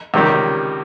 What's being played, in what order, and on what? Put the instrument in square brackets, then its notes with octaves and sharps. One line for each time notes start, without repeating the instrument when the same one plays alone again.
[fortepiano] C#2 C3 D#3 G3